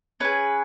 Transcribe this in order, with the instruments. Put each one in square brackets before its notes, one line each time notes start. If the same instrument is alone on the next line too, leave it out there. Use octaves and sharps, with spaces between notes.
[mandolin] C#4 G#4 B4